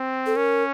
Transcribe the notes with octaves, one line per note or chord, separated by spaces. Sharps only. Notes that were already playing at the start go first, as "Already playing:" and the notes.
Already playing: C4
A4
C#4 A#4